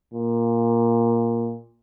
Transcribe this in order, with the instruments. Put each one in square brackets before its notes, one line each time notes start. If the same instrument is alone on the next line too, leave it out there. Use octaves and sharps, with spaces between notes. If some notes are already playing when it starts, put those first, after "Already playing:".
[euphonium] A#2